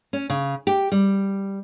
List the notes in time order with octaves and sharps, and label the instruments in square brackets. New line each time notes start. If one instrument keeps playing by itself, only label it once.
[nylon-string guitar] C#4
C#3
G4
G3